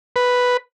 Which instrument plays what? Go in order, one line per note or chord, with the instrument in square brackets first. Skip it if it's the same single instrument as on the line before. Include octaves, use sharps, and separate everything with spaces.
[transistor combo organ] B4